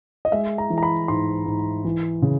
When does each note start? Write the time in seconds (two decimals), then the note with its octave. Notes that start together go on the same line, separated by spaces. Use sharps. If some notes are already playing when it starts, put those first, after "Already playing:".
0.25 D#5
0.32 G#3 E5
0.58 A#5
0.70 E3
0.78 A#5
0.83 B5
1.08 G#2 C6
1.46 G#2
1.85 E3
2.22 C#3